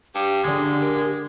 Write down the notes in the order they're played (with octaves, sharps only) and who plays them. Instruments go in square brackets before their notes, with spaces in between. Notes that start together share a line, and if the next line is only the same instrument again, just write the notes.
[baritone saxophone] G2 [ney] G4 [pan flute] D6
[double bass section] D3 [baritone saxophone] G#3 [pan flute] D#6
[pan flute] A#4